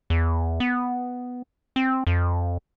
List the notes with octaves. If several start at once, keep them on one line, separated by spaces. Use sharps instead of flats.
E2
B3
C4
F2